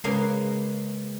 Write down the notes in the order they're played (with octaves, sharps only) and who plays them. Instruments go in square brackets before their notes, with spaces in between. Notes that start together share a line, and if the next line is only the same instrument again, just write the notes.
[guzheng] C#3 A#3 C6 [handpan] G#3 B4